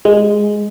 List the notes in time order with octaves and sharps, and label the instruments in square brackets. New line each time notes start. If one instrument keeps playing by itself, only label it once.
[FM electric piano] G#3